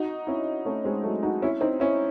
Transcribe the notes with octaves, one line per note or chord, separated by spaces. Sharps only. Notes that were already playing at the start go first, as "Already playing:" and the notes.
Already playing: D#4 F#4
C#4 E4
A3 C#4
G#3 C4
F#3 A3
D#4 F#4
C#4 E4
C4 D#4
C#4 E4